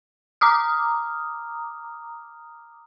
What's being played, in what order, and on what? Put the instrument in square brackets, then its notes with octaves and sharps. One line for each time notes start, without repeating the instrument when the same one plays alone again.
[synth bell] A#5 D6 D#6 F6